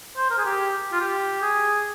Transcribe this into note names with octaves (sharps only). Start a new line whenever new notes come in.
C5
A#4
G#4
G4
F4
G4
G#4